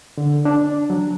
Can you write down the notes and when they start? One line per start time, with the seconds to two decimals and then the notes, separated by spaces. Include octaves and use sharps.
0.18 D3
0.45 D4
0.90 F#3